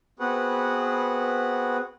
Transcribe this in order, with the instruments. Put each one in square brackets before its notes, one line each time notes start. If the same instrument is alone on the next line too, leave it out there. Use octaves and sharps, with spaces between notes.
[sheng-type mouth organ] B3 C4 F#4 G#4 B4 F#5